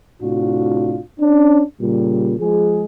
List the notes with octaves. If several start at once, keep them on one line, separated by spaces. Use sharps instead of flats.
A2 C3 D4 F4 F#4
C#4 D4
A#2 C#3 G3
F3 G#3 G#4